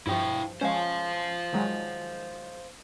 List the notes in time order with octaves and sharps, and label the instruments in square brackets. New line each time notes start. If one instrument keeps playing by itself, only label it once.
[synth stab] G2 F3 [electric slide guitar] E4 G5
[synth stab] F3 G#3 C#4 [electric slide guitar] C5 F5
[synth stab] D#3 F#3 G#3